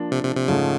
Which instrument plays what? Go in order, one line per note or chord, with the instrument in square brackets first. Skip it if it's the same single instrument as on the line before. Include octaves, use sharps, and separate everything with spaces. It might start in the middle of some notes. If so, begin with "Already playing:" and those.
Already playing: [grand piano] F3 A#3 D4
[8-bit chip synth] C3
C3
C3
[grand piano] G#2 F3 A3 [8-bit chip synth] C#3